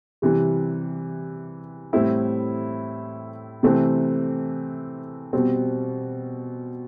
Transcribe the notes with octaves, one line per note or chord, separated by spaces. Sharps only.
C3 E3 G3
A2 G3 C4 E4
C3 E3 A3 C4
B2 G3 C4